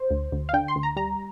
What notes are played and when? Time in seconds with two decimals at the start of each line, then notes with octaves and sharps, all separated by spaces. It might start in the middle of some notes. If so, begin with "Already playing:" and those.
Already playing: C5
0.11 D2
0.32 D2
0.49 F5
0.53 D3 G5
0.68 C6
0.76 D2
0.83 A#5
0.96 G3 A#5